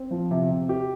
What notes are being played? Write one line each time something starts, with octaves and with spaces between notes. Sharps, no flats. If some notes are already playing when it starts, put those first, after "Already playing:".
Already playing: C4
F3
C3
C3
G4